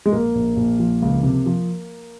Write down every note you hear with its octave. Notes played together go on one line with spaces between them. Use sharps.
G#3
A#1 A#3
A#1
A#1
F3
C#2
C3
F3